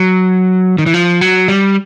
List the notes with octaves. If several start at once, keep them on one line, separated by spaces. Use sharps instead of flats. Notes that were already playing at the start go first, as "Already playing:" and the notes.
Already playing: F#3
D#3
E3
F3
F#3
G3